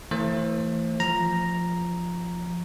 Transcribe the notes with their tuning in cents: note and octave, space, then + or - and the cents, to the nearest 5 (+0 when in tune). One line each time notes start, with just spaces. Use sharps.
E3 +0 A3 +30 C5 +35
F3 +0 A#5 +0